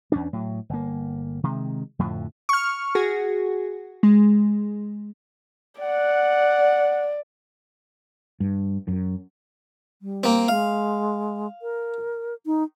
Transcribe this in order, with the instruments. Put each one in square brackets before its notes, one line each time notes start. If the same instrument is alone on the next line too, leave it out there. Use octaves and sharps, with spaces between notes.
[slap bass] E2 C#4 D4
A2 F#3
G1 A#3
C3 D#3 G#3
F2 A2 D3 F3
[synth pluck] C#6 F6
F#4 G#4
G#3
[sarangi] D5 [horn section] F#5
[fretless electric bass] G2
F#2
[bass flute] G3
[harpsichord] A#3 C4
[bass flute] G#3 [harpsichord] F5
[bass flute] A#4
D#4